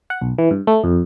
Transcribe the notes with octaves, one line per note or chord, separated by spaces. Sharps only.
F#5
B1
E3
G2
A3
F2